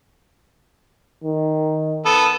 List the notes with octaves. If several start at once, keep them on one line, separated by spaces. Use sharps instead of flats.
D#3
B3 A4